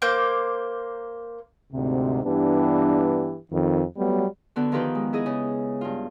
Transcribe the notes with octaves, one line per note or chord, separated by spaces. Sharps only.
A#3 C5 D6 G6
D2 G#2 C3
G2 E3 B3 D4 G4
F2 D#3
F#3 G3 A3 B3
D3 B3 F#4
D#3 F3 D#4 F4 G4 B4
G#3
E4 G#4 D#5
C#3
G2 F4